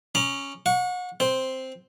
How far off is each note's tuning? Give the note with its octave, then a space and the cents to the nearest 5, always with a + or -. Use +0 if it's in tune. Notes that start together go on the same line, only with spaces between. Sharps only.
C#4 +0 A#5 +40 D6 +30
F#5 -35 C#6 +15
C4 +0 C5 +0